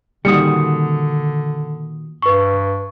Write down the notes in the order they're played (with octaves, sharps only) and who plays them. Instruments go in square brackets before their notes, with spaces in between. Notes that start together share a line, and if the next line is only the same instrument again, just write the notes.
[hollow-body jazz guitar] A#2 D#3 F#4 [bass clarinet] D3 [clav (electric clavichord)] G3 [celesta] D#6 C#7
[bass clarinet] G2 [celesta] B4 C#6